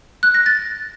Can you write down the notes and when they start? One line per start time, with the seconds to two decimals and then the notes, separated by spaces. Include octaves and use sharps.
0.23 F#6
0.34 A#6
0.46 A6